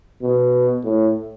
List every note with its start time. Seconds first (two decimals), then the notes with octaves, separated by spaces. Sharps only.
0.22 B2
0.85 A2